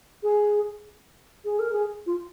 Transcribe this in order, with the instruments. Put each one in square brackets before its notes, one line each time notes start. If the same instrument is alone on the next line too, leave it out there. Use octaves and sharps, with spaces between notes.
[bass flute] G#4
G#4
A#4
G#4
F4